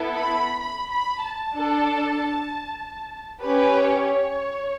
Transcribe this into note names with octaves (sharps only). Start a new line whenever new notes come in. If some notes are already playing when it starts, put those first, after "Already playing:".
Already playing: B3 E4 A4
B5
B5
B5
A5
D4 A4
C#4 G4 B4
C#5